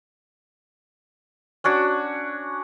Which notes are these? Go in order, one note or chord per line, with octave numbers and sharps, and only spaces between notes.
C#4 D4 F#4